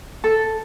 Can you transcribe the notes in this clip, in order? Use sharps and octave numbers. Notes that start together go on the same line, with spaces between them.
A4